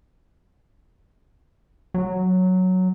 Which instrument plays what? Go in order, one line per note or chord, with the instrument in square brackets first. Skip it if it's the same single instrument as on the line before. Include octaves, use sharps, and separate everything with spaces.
[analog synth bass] F#3